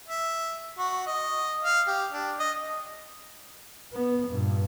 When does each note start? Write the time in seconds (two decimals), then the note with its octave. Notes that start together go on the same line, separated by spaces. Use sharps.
0.08 E5
0.78 F#4
1.06 D#5
1.64 F5
1.87 G4
2.13 D4
2.39 D#5
3.93 B3
4.29 G2 A#2